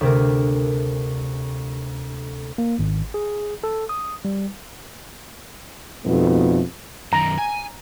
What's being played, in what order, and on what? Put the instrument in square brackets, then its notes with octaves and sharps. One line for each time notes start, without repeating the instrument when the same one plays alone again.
[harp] D2 C3 A#4
[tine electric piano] A#3
G#1
G#4
A4
D#6
G3
[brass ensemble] F2 B2 G3 A3 B3 D#4
[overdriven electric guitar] F#2 D#3 [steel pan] A#5
[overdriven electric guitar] G#5